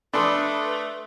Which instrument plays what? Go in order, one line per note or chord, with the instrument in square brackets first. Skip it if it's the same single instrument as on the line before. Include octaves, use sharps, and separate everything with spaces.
[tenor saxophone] A3 [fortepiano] D4 A4 [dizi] B4 [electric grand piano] B5 C6 D#6